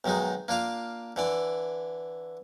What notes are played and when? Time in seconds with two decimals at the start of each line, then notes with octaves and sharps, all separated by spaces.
0.04 B1 D#3 F#3 G#3 D#4
0.48 A#3 D4 F4 F5
1.16 D3 E3 D5